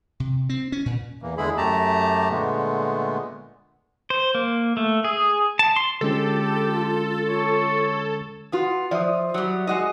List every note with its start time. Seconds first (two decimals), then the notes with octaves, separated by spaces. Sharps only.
0.20 C3
0.49 C4
0.72 C#4
0.86 A#2
1.22 E2 E3 A#3
1.38 E2 D3 G#3 E4 G#4 B5
1.57 F#2 A3 G4 A5 A#5
2.30 A#2 D3 G#3 A3 B3
4.10 C5
4.35 A#3
4.77 A3
5.04 G#4
5.59 A5
5.76 C6
6.01 D3 G#3 C#4 F4 G4 A4
7.24 C#5
8.52 B3 F4 F#4 D#6
8.91 F3 D5 E5 D#6
9.34 F#3 G3
9.67 G#3 F#4 D#5